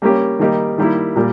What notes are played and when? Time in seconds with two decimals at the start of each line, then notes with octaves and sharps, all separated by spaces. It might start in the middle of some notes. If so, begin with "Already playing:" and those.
0.02 G3 A#3 C#4 G4
0.39 D#3 G3 A#3 D#4 G4
0.78 D#3 G3 A#3 E4
1.16 A#2 G3 A#3